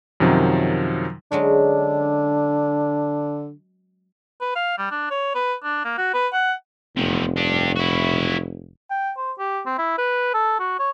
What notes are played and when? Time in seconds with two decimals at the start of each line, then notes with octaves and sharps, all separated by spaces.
0.20 F#2 C3 D#3 F3 F#3
1.32 D3 F#3 G#3 C#4 D4
4.41 B4
4.55 F5
4.78 G3
4.91 D4
5.11 C#5
5.35 B4
5.63 D4
5.84 A#3
5.98 F#4
6.14 B4
6.33 F#5
6.97 F1 E2 C3
7.37 D4 G4
7.76 E4 F#4
8.90 G5
9.17 C5
9.39 G4
9.66 C4
9.78 E4
9.98 B4
10.34 A4
10.59 F#4
10.79 C#5